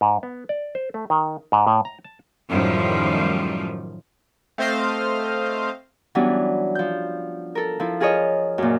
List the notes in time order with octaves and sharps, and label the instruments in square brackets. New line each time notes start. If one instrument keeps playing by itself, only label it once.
[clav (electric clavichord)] G#2
B3
D5
C5
A3
D#3
G#2
A2
A#5
A5
[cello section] F#2 A2 D#3 F3 G3
[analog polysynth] A3 C4 C5 D#5 F5
[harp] E3 F#3 G3 B3 C#4 D4
F3 G6
A4 A#4
F3 E4
F4 G#4 A#4 C#5 D#5
F#2 A#2